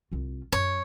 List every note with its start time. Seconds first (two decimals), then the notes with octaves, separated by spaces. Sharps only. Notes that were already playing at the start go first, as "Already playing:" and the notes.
0.12 C2 F4
0.52 F#2 C#5